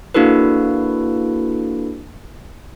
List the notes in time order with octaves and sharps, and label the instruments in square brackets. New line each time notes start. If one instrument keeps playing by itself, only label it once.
[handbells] A#3 D4 E4 F#4 A4 B4